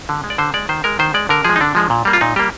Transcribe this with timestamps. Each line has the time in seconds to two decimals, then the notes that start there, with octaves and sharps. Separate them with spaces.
0.09 D3
0.24 G#3
0.30 D5
0.38 D3 C5
0.54 G#3 D5
0.69 D#3 C5
0.84 G#3 A#4
0.99 D#3 C5
1.14 G#3 D5
1.29 D3 A#4
1.44 F3 G#3 G#4
1.56 D#4
1.60 D3 D4
1.75 F3 G#3
1.90 A#2
2.05 G3 A#3
2.13 F4
2.21 A#2 D#4
2.36 G3 A#3 G4